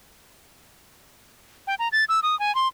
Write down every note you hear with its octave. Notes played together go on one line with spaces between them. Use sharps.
G5
A#5
A6
E6
D#6
G#5
C6